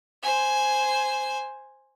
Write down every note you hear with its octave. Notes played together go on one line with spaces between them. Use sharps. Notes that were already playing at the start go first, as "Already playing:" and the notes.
C5 G#5